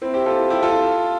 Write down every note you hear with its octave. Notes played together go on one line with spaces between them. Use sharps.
C4 E4
E4 G4
F4 A4
E4 G4
F4 A4